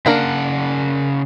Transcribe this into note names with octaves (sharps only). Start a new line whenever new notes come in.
C#3 A#3 D4 A#4 F#5